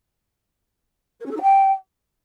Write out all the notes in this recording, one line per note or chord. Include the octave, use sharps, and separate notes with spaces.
A#4
C#4
A4
D#4
G5